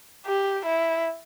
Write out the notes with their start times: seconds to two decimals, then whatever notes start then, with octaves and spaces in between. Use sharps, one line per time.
0.26 G4
0.66 E4